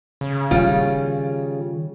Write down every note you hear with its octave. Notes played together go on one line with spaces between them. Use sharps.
C#3
D#3 G3 F4